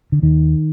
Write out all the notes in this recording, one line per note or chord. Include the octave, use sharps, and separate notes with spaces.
D3
D#2 D#3